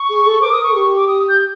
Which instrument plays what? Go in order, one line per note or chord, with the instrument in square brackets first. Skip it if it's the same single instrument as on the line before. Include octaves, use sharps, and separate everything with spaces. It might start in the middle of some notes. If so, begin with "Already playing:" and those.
Already playing: [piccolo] C#6
[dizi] G#4
A4
[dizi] A#4 C5 [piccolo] D6
[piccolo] D#6
C#6
[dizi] G4 [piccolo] C#6
[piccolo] D6
D#6
G6